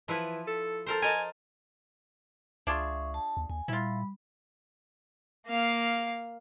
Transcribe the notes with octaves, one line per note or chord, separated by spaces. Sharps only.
E3 F3 E4 B4
A4
A4 A#4 C5
A#4 D#5 G#5 A5
C#2 D4 F4 G#4 E5 C#6
A5
D#2
D#2 G#5
A#2 G3 E4 F4 B5
A#3 F5